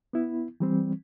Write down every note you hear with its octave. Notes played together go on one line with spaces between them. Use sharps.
B3 E4
E3 G3 C4